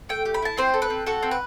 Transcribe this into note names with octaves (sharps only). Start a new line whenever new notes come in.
A3 G5
G4
B5
E4 A5
C4 C5
A4
B4
C4
F#4 A4
C4
B4